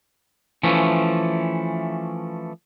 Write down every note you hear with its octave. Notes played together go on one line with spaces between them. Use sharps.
E3 F3 A3 C#4